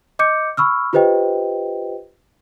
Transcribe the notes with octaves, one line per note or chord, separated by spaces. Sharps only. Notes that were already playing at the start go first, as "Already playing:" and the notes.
D#5 D6 G6 C#7
B5 C#6 E6 F6
F4 G4 B4 C5 D#5 G5